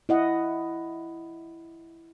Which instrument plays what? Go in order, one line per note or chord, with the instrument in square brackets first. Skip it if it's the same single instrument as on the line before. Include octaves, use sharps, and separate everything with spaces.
[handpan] E4 D#5 F#5